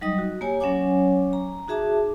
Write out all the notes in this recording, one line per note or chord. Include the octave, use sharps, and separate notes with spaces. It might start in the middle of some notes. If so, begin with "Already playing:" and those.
F#3 G3 D#4 D#5 D#6
F#4
A#3 G4 C#5 G#5
F#3 C#4 C#5 F#5 G#5 D6
A#5
D#4 F#4 G#4 E5 A5 D6